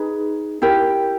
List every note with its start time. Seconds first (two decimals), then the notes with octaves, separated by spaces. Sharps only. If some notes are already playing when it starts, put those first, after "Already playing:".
Already playing: D#4 G#4 B4
0.62 E4 G4 A#4